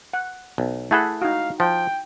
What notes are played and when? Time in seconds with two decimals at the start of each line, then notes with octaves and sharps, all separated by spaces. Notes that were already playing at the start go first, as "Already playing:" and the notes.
0.13 F#5
0.58 B1
0.91 A3 E4 G#4 A4 F#5 B5
1.21 D#4 F#4 F5
1.60 F3 G5